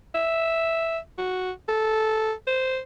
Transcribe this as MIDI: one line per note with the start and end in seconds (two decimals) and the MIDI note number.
0.15 0.98 76
1.18 1.51 66
1.69 2.33 69
2.47 2.79 72